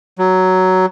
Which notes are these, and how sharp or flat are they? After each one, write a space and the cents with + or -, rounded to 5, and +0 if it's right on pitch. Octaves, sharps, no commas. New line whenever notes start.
F#3 +10